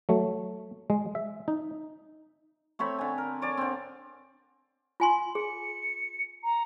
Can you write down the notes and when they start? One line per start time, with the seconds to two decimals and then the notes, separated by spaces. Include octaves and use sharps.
0.09 F#3 A3
0.90 G#3
1.15 E5
1.48 D#4
2.79 A3 C4 C#5 B5
2.99 D3 G#5
3.18 A#4
3.42 C#5 D5 G#5
3.57 D3 C4
5.00 F4 G#5 C6
5.35 G#4 C#7
6.43 A#5